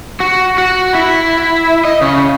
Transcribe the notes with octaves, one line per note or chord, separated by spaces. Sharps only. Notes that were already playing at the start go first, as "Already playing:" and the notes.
F#4
F#4
E4
D#5
C#3